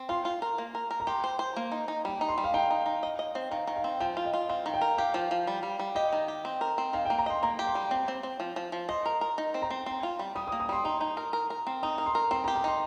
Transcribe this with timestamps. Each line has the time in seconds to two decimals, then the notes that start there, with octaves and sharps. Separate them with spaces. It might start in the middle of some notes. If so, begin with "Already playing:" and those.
Already playing: C4
0.09 F4 C6
0.25 F4
0.42 A#4
0.58 A#3
0.75 A#4
0.91 A#4
1.00 A#5
1.07 G4 C6
1.24 C5
1.39 C5
1.56 A#3
1.72 D#4
1.88 D#4
2.05 G3
2.21 D#4
2.29 C6
2.38 G3
2.44 F5
2.54 D#4 G5
2.70 D#4
2.86 D#4
3.03 D#5
3.19 D#5
3.35 C4
3.51 D#3 F5
3.67 D#3
3.76 F5
3.84 C4
4.00 F3 G5
4.17 F4
4.25 D#5
4.33 F4
4.49 C4 F5
4.66 D#3
4.74 G5
4.81 A#4
4.98 G4 F5
5.14 F3
5.31 F3
5.47 G3
5.63 G3
5.79 G3
5.95 G4 D#5
6.13 D#3
6.28 G4
6.45 C4
6.61 A#4
6.78 C4
6.93 D#3 F5
7.05 G5
7.10 A#3
7.19 A#5
7.26 D#5 C6
7.43 A#3 A#5
7.59 G4
7.67 C6
7.75 G3
7.91 C4
8.08 C4
8.23 C4
8.40 F3
8.56 F3
8.72 F3
8.89 D#5 C6
9.06 A#4
9.21 A#4
9.38 D#4
9.54 C4
9.62 A#5
9.70 C4
9.86 C4
10.03 F4
10.19 G3
10.35 G3 D#6
10.47 D#6
10.52 A#3
10.60 D#6
10.69 G3 C6
10.84 D#4 C6
11.01 D#4
11.17 A#4
11.33 A#4
11.50 A#4
11.67 C4
11.83 D#4 D#6
11.98 A#4
12.06 C6
12.15 A#4
12.31 C4 C6
12.44 A#5
12.48 G4
12.56 A#5
12.64 D#4 C6